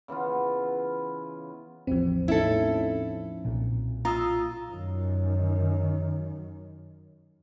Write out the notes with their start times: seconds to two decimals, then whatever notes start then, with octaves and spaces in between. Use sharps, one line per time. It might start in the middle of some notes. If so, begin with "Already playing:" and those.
0.08 C#3 E3 B3 F4
1.87 A1 E2 F3 C4
2.28 A2 C#4 D#4 E4 A4
3.45 B1 A#2
4.05 F4 A#5 D#6 E6
4.71 F#2 D#3